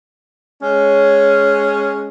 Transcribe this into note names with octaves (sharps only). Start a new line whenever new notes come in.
G#3 C#4